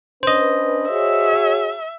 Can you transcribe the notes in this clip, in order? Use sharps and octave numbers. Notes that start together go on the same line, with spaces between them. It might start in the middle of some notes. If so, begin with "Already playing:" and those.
C#4 D4 B4 C5 D#5
F#4 G#4 C#5 E5